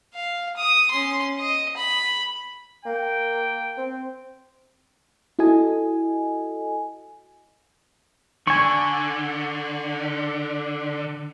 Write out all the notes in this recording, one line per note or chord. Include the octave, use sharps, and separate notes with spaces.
F5
D#6
C#4 C6
D#5
B5
A#3 G5
C4
E4 F#4 A4 D#5 G#5
D3 G#5 C#6